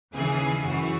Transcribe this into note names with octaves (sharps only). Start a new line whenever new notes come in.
D#2 C#3 E3 G#4
F#2 E3 F#4